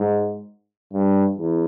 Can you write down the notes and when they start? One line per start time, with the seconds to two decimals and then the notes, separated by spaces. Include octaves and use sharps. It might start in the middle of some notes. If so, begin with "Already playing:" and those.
Already playing: G#2
0.93 G2
1.37 E2